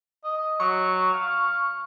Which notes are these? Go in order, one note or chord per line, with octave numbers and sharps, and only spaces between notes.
D#5
F#3 C#6
F5